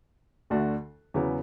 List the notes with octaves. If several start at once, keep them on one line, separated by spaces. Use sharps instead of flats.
D2 D3 A3 D4 F#4
E2 C#3 F#3 B3 E4